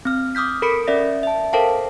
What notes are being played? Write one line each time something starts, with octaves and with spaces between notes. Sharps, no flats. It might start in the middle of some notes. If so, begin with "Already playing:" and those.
C4 F6
D6 D#6 F6 G6 B6
A4 A#4 B5 B6 C#7 D7
C#4 A#4 D5 E5 A#6
E5 A5
A4 A#4 C5 F5 G5 A5